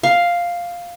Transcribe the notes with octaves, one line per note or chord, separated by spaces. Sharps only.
F5